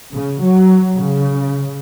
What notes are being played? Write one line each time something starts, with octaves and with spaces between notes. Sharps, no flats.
C#3
F#3
C#3